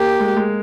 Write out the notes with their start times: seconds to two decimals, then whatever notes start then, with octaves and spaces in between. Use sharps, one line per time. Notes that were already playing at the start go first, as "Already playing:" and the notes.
Already playing: A#3 G4
0.20 G#3
0.37 G#3